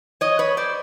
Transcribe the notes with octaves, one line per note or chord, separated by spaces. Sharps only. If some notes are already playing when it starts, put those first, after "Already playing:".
C#5 D#5
B4 C#5
C5 D5